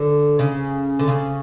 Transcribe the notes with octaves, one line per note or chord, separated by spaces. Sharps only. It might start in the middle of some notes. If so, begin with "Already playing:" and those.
Already playing: D3
C#3
D3
C#3